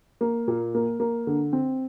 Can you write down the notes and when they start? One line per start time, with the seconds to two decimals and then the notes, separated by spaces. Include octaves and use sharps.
0.21 A#3
0.48 A#2
0.75 A#3
1.00 A#3
1.27 D3
1.53 C4